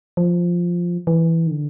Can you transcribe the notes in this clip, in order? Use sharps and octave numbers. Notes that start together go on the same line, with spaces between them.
F3
E3
D#3
D3